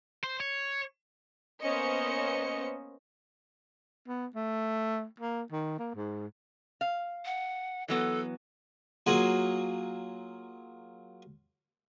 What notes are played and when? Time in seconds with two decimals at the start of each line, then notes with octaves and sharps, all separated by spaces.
0.24 C5
0.40 C#5
1.61 A#3 B3 C#4 C5 D#5 C#7
4.08 B3
4.35 A3
5.20 A#3
5.52 D#3
5.79 A#3
5.95 G#2
6.81 F5
7.25 F#5
7.88 E3 F#3 B3 A4
9.06 F#3 A#3 F4 F#4 G#4